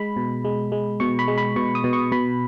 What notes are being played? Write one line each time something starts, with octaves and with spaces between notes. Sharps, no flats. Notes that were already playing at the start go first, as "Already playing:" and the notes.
Already playing: G#3 B5
B2
G#3
G#3
B2 C#6
B5
G#3
B5
B2 C#6
D#6
B2
C#6
B2 B5